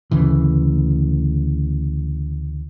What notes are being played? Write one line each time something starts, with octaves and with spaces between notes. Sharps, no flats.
D2 C#3 E3